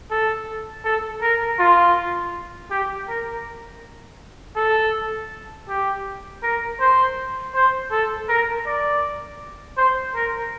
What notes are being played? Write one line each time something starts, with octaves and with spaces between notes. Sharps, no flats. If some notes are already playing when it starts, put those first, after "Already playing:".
A4
A4
A#4
F4
G4
A#4
A4
G4
A#4
C5
C5
A4
A#4
D5
C5
A#4